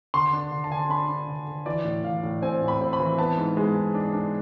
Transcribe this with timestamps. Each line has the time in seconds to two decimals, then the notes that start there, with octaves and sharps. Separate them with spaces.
0.14 D3 C6
0.33 D4
0.52 D3
0.64 A5
0.71 D3 G#5
0.79 A5
0.89 D4 B5
1.08 D4
1.28 D3
1.47 D3
1.66 E3 D5
1.85 A2
2.04 E3 F5
2.23 A2
2.42 C4 G#5
2.62 A2
2.68 B5
2.81 C4
2.93 B5
3.00 E3
3.18 B3 A5
3.37 G#2
3.57 G#3
3.75 G#2
3.94 D4
4.13 D4